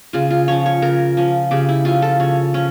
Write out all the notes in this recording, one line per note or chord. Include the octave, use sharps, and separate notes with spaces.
C#3 F4
F4
F3 C#4 C#5
C#5
C#3 A#4
F3 C#4
C#3 G4
E4
F3 C#4 F4
A4
C#3 C#5
F3 C#4